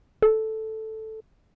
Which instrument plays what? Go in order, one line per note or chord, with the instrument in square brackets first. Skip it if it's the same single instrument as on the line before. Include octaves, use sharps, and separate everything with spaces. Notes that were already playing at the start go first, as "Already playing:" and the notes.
[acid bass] A4